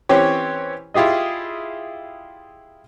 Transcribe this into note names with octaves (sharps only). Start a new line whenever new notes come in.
E3 C4 C#4 G4 C#5
E4 F4 G4 G#4 D#5